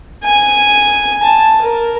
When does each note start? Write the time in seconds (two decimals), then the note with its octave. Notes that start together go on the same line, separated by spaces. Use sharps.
0.24 G#5
1.23 A5
1.62 A#4